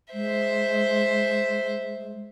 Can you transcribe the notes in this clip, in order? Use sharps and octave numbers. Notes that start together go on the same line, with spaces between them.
G#3 C5 E5